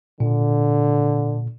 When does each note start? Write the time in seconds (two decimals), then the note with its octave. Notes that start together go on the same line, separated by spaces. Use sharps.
0.20 A#2 D3